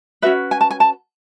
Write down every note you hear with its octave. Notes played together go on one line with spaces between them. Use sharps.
C#4 F#4 B4 E5
G#5
A5
G#5
A5